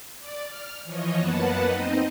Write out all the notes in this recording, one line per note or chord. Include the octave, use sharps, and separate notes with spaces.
D5
F6
E3 F3 C#5 D#5
F#2 A#3 B3 B4 F#5 A5
C4 D#4 D#5